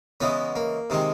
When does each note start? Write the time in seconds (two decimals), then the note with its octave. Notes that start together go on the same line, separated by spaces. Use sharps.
0.21 C#3 E3 G#3 B3
0.56 A#3
0.90 C3 D#3 G#3